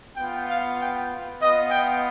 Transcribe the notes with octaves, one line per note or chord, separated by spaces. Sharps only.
B3 F4 G5
F5
G5
B3 F4 D#5
G5